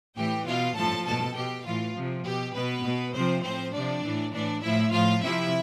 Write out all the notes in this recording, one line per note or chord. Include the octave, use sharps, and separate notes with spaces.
A2 E3 G4 G5
B2 F4 F5
A2 F3 A4 A5
B2 A4 A5
B2 G4 G5
A2 E3 F4 F5
C3 F3
B2 G4
B2 B3 B4
B2
C3 F3 C4 C5
A2 F3 C4 C5
C3 F3 D4 D5
A2 E3
A2 E3 D4 D5
A2 F3 E4 E5
A2 F3 F4 F5
C3 F3 E4 E5